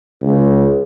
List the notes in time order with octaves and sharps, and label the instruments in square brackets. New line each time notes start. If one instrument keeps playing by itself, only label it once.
[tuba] C#2